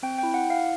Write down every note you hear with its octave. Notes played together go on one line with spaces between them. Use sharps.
C4 G5
E4 G5
F#5
E4
F5